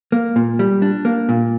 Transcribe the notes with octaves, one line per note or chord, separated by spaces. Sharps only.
A#3
A#2
G3
D4
A#3
A#2